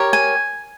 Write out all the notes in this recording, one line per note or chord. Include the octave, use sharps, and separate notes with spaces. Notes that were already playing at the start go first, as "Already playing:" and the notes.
Already playing: G4 A#4 C#5
G#5